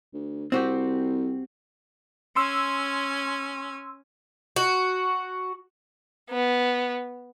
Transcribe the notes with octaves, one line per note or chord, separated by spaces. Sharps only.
D2
C2 C4 F#4 G4
C#4 G#5 C6 E6
F#4
B3